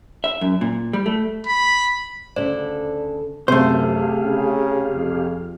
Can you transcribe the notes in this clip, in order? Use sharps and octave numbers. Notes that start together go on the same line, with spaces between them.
E5
F#2
A#2
G3
A3
B5
D2 C#3 A4 C5 D5
F#2 C3 A3 G4 G#4 C5 F5
C#3
F2